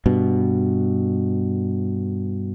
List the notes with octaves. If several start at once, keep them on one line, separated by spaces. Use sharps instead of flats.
G2 B2